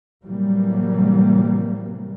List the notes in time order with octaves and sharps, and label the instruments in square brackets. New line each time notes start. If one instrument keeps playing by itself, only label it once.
[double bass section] A2 C3 E3 F#3 G3 A#3